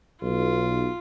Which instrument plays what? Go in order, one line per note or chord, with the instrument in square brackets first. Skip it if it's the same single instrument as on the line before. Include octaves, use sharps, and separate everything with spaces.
[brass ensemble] B1 [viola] F4